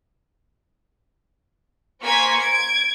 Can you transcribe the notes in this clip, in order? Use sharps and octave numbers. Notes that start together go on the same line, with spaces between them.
A#3 C5 G#5 C#6 G#6 B6
G#6 D7